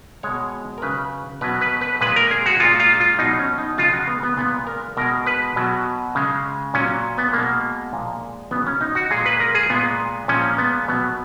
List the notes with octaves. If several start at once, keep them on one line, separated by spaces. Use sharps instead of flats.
B2 G#3 C#5
A#4
C#3 F#3 B4
B2 F#3 B4
B4
B4
A#2 G#3 B4
A#4
G#4
F#4
A#2 G#3 F4
F4
F4
B2 F#3 D#4
C#4
D#4
C#3 F3 G#3 F4
F#4
B3
B3
A#2 G#3 B3
A#4
B2 G#3 A#4
B4
B2 F#3
C#3 G#3
A#2 F#3 C#4
B3
B2 G#3 A#3
A#2 F3 G#3
C#3 F#3 B3
C#4
D#4
F#4
A#2 G#3 G#4
B4
A#4
G#4
A#2 G#3 B3
A#2 F3 G#3 C#4
B3
B2 F#3 B3